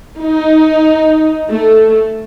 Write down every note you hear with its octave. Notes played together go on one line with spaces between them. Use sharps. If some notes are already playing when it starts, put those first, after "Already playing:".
D#4
A3